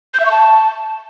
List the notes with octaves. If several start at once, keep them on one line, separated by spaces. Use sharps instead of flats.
G6
E5
C#6
A5